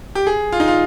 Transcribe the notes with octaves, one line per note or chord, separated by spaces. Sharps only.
G4
G#4
F4
D#4
F4